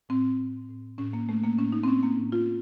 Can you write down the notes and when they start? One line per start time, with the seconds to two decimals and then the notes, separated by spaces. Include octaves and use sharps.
0.09 A2 C4
0.39 A2
0.69 A2
0.98 A2 C#4
1.13 A#3
1.29 A2 A3
1.44 A#3
1.58 A2 C#4
1.72 D#4
1.84 C4
1.87 A2 C#4
2.03 A#3
2.18 A2
2.32 F4